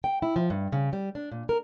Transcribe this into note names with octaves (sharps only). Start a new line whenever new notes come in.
G5
E4
F3
G2
C#3
G3
D4
A#2
A#4